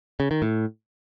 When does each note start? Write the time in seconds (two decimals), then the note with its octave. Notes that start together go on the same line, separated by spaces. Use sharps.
0.20 C#3
0.31 D#3
0.42 A2